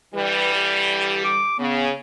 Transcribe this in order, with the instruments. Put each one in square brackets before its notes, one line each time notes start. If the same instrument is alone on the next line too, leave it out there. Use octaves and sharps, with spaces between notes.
[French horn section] D3 E3 G3 [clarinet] B4
[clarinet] G4
D6
[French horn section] C#3 [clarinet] B3